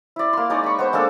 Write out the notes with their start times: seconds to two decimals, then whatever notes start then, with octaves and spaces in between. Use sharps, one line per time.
0.16 E4 D5
0.33 A#3 C6
0.50 G#3 D#4 C#5 D5
0.64 B5 C#6
0.79 B3 D#4 C5
0.93 G#3 A#3 D4 A4